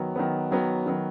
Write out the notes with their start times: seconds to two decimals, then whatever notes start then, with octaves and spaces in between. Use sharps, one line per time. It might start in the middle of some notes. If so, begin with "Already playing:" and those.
Already playing: D#3 F#3 B3
0.16 D#3 F#3 B3
0.51 D#3 F#3 B3
0.86 D#3 F#3 B3